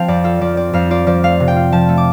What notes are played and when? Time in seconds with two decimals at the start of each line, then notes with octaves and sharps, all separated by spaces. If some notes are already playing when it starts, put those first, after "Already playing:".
Already playing: F3 C4 F5 G5 A5
0.08 F2 D5
0.24 F4 A4
0.41 F3 D5
0.57 C4 D5
0.73 F2 F5
0.90 F4 D5
1.07 F3 D5
1.23 A3 F5
1.40 C3
1.48 G5
1.56 F4
1.72 F3 A5
1.89 A3
1.97 D6